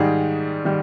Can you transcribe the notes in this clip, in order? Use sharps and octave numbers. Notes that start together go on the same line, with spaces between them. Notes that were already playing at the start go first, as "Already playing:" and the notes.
Already playing: G#2 D#3 G3 G#4
D#3 G3